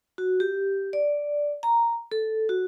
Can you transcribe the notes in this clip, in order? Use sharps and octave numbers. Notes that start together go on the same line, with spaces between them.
F#4
G4
D5
A#5
A4
F#4